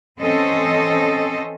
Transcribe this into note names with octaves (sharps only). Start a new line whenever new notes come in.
E3 C4 C#4 A4 C5 D#5